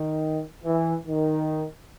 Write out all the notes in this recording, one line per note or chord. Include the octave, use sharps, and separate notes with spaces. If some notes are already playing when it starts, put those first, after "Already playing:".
Already playing: D#3
E3
D#3